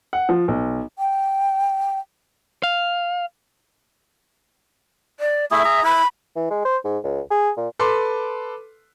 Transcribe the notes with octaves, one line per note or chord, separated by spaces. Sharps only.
F#5
F3
B1
G5
F5
D5
A3 E4 G#4 E5
G#4 A#5
E4 B5
E3
G#3
C5
G#2
C#2
G#4
A#2
A4 B4 C6 D6